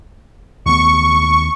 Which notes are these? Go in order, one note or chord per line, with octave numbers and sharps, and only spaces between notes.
D#2 A3 B3 C#6